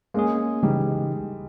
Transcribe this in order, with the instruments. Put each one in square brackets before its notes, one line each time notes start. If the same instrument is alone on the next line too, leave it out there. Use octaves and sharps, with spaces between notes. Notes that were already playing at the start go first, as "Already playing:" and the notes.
[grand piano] G#3 [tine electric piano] A#3 C#4 G#4
[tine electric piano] C#3 E3 G#3 D#4 [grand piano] G3